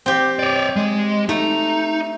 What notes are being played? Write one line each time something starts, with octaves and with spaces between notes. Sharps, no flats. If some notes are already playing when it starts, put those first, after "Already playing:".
C4 G4
C#5 D5
G#3
A3 D#4